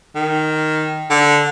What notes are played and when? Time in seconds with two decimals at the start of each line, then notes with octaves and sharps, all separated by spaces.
0.15 D#3
1.10 D3